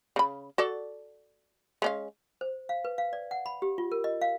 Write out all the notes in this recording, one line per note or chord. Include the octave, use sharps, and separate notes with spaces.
C#3 B5
F#4 A4 D5
G#3 C#4 F5
C5
F5
B4
F5
D5
F#5
B5
G4
F4
A#4
D#5
F5